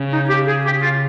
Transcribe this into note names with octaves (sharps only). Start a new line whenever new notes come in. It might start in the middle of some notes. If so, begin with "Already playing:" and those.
Already playing: C#3
D#4
G4
G#4
G4
F4